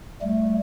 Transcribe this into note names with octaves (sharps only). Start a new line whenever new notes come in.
G3 A3